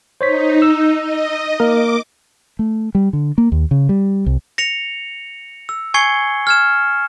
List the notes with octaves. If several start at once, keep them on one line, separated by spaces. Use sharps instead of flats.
D#4 C5 C#5 B6
E6
D#5
A#3 A#4 D6
A3
G3
D3
A#3
D#2
C#3
G3
C2
A#6 C#7 F7
E6
G#5 C#6 G#6 C7 C#7 G7
F6 G#6 E7